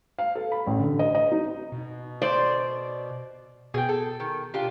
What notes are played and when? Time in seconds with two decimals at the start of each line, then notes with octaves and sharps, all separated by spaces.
0.18 F5
0.35 A4
0.52 B5
0.67 A1
0.79 D3
0.99 D#5
1.15 D#5
1.32 D#4
1.72 B2
2.22 C5 D5
3.74 B2 G#4 G5
3.89 A4
4.20 D#3
4.54 D4 F4 G4